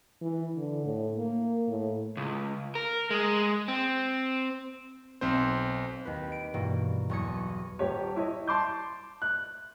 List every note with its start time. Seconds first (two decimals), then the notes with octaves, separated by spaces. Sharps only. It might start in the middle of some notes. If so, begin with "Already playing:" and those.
0.21 E3
0.56 D3
0.86 A2
1.17 A#3
1.68 A2
2.17 C#2
2.75 A#4
3.10 G#3
3.68 C4
5.21 B1 C4 C5
6.05 D#2 B4
6.32 D7
6.54 G2 B2 E3 A#3
7.10 B1 E2 C#6 D#6 G#6 C#7
7.79 D#1 G4 C#5
8.16 E4 C#5 D#5
8.48 A5 C6 D6 G6
9.22 F#6